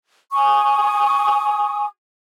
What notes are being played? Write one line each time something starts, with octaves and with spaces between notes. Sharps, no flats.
G#5 C#6 D#6